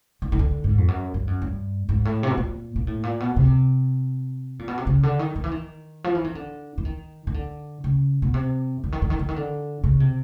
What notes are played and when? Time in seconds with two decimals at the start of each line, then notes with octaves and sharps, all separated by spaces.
0.22 D#3
0.32 D#3
0.39 D3
0.64 G#2
0.78 F2
0.88 F#2
1.14 G2
1.27 F#2
1.42 G2
1.89 G#2
2.05 A2
2.23 C3
2.30 B2
2.37 A#2
2.76 A#2
2.87 A2
3.03 A#2
3.20 B2
3.36 C3
4.59 A#2
4.68 B2
4.78 C3
4.87 C#3
5.03 D3
5.19 D#3
5.36 D#3
5.44 E3
5.52 D#3
6.04 F3
6.15 E3
6.24 D#3
6.35 D3
6.78 E3
6.85 D#3
7.27 D#3
7.34 D3
7.84 C#3
8.22 B2
8.34 C3
8.84 D3
8.92 D#3
9.02 D3
9.10 D#3
9.19 D3
9.29 D#3
9.36 D3
9.84 C#3
10.00 C3